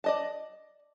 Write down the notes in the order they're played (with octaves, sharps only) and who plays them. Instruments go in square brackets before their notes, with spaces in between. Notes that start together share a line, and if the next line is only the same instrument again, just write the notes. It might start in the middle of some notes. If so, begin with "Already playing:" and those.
[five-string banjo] D5 D#5 A5